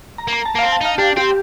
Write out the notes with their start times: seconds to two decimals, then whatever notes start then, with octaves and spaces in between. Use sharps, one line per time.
0.18 A#5
0.28 A#3
0.33 A#5
0.45 A5
0.55 A#3
0.59 C4 F5
0.72 A5
0.81 D#4 F5
0.98 D4 G4
1.16 C4 G4